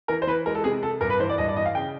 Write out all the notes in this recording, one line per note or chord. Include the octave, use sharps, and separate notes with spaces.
E3 A#4
C5
E3 B4
G#3 A#4
A4
C3 G#4
C3 A4
G2 A#4
B4
E3 C5
D5
G2 D#5
D5
E3 D#5
F5
C#3 G5